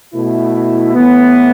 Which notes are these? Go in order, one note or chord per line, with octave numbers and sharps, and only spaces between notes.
B2 A3 E4
A2 E3 B3